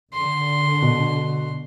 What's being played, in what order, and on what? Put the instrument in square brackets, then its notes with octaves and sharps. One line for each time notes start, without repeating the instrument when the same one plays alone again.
[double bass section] D3 [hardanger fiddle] C6
[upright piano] B2